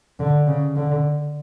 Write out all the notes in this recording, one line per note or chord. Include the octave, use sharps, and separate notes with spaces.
D3
C#3
D3